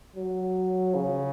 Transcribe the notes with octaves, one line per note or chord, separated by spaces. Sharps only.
F#3
C#3